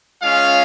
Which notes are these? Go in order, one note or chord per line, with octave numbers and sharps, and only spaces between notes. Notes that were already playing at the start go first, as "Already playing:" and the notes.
G#3 C#4 F4 F5